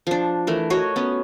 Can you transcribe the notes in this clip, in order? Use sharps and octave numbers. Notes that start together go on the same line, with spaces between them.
F3 D4
E3 A3 A#4
F#4 C#5 D#5
B3 C#4